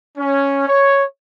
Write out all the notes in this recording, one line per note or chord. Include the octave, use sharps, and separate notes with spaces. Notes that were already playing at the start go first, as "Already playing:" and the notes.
C#4
C#5